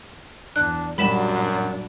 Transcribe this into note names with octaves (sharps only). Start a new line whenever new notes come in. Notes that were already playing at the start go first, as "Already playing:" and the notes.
E2 D4 F#6
F#2 A#2 F#3 G3 D4 B5 B6 E7